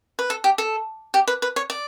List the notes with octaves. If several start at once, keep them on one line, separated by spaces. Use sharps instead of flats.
B4
A4
G4
A4
G4
B4
B4
C#5
D5